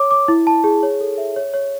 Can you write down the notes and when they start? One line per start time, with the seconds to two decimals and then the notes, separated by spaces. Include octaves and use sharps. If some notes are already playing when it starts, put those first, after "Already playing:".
Already playing: C#5 D6
0.11 D6
0.28 E4
0.47 A5
0.64 G#4
0.83 C#5
1.01 A4
1.18 E5
1.36 C#5
1.54 C#5